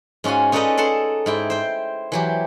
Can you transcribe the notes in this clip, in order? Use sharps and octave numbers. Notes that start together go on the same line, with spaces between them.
G#2 C#4 F4 F#4 G#5
C#4 D#4 A4 B4 D5 D#5
G#4 A4 F#5 A5 C6
G#2 E4 G5
C5 G5
E3 F#3 G4